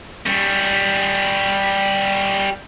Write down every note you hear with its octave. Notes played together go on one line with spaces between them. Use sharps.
G3 C#4